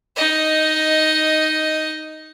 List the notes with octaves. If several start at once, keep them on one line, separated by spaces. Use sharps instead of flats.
D#4 D#5